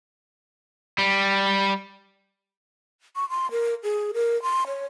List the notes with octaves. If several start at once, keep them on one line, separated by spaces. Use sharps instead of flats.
G3
C#6
C6
A#4
G#4
A#4
C6
C#5